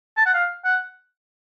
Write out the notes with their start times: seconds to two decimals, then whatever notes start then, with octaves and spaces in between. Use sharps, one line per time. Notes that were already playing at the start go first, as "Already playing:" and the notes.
0.17 A5
0.26 F#5
0.34 F5
0.65 F#5